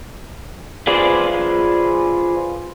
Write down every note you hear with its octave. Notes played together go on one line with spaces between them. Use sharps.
F4 G#4 B4 C5 D5